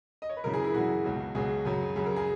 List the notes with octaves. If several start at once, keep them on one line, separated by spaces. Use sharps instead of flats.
D#5
C#5
B4
F#2 C#3 E3 A#4
G#4
E4
F#2 C#3 E3 F#4
C#2 B2 F#3
C#2 B2 F#3 G#4
F#2 C#3 F#3
F#2 C#3 F#3 G#4
A#4
G#4